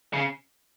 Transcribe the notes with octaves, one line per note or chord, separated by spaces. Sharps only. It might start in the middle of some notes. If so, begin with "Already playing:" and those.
C#3